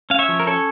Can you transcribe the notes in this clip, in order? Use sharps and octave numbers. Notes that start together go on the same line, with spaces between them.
C#4 F5
C#5 E5
F3
A#4
C#4 A4 C#5